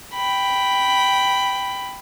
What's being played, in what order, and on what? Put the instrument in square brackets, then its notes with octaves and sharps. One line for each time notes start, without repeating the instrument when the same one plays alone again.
[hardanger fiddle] G5 B5